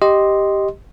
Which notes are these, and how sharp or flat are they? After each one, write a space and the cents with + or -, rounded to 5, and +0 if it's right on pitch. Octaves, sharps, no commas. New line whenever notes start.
G4 +0 D#5 +0 C6 +0